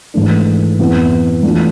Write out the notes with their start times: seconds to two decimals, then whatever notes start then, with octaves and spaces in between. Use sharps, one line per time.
0.14 G#2 E3 A3 D4
0.79 F2 E3 B3 E4
1.43 E3 A3 D4 F4